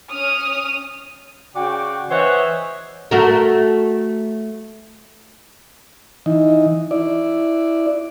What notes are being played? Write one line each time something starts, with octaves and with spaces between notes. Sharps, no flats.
C#4 D#6 F6
C#3 F#4 D5 G5
E3 C5 C#5 D#5 E5 F#5
A3 F#4 A#4
E3 D#4
E4 D5